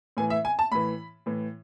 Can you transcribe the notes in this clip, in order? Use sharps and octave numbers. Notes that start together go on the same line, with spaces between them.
A2 E3 G#5
E5
G#5
A5
A2 E3 B5
A2 E3